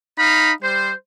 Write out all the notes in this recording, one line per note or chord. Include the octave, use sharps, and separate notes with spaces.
D#4 F5 B5
G3 C5